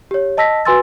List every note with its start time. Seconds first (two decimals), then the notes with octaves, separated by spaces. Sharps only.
0.11 G4 C#5
0.37 D#5 A5 E6 A#6 B6
0.65 F#4 B4 G#5 C6 E6 A6